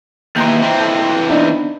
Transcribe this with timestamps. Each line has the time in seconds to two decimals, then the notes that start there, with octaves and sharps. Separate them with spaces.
0.36 D#2 E3 G5 A#5 C6
0.62 E3 C4
0.80 A4
1.30 B3 D4 D#4